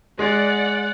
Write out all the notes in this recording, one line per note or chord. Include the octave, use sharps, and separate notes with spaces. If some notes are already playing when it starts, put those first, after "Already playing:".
G#3 D5 F#5